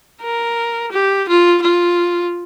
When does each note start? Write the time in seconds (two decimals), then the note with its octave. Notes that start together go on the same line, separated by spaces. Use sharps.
0.22 A#4
0.92 G4
1.28 F4
1.62 F4